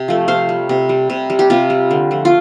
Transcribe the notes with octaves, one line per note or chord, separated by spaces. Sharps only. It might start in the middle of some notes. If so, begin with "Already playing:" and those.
Already playing: C3
F3 A3
C3 C5 F5
G3
C3
G3
C3
G3
G4
C3 C4 F4
G3
D3
F3 A3
F4